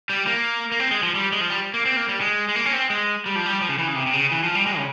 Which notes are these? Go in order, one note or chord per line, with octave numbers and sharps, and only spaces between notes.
G3
A#3
A#3
C4
G#3
F3
G3
G#3
F3
G3
A#3
C4
A#3
G3
G#3
G#3
A#3
C#4
C4
G#3
G3
F3
G3
F3
C#3
E3
C#3
C3
C3
C#3
E3
F3
G3
G#3
C#3